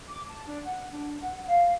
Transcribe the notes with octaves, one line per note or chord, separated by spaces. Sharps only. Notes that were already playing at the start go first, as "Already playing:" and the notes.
D6
A5
D4
F#5
D4
F#5
F5